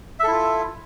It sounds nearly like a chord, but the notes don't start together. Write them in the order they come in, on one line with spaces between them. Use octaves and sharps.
E5 A4 E4 F4